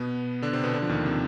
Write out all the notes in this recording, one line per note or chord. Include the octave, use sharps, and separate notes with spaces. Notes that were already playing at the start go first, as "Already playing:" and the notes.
Already playing: B2 B3
D3 D4
C3 C4
B2 B3
D3 D4
F3
D#2 D#3
C3